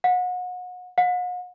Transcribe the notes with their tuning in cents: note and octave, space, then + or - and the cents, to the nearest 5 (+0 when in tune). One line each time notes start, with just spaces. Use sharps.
F#5 -35
F#5 -45